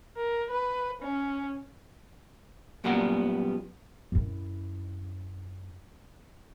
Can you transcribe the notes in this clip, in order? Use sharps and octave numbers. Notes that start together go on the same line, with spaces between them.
A#4
B4
C#4
F#2 A#2 G3 B3 F#4 A#5
F#2 E4